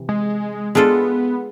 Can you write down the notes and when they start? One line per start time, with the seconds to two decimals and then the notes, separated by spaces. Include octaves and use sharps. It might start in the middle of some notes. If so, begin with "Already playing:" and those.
Already playing: C3 E3
0.09 G#3
0.75 G#3 B3 D4 F4 A4